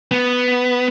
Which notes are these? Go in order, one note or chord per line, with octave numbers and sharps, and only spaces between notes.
B3